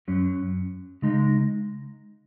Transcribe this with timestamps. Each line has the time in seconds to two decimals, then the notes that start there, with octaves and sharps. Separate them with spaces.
0.08 F#2 F#3 C#4
1.02 C#3 G#3 D#4